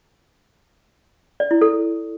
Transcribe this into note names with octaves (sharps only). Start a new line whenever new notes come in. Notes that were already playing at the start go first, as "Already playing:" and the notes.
D5
E4
A4